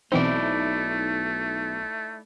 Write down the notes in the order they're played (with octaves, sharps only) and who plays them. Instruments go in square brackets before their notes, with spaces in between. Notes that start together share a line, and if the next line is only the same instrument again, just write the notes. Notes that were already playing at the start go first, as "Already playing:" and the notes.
[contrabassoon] B1 [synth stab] B2 E3 C4 [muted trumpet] A3 [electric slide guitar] D#4 E4 D5